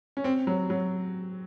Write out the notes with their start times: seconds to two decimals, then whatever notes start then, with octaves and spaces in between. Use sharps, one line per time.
0.17 C#4
0.24 C4
0.47 F#3
0.70 F#3